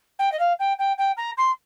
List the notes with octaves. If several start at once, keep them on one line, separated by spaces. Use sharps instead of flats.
G5
D#5
F5
G5
G5
G5
A#5
C6